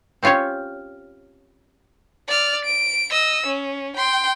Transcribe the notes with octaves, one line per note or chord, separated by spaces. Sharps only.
C4 C#4 F4 G4 C#5
D5 F6
D7
D#5 E6
C#4
G5 C6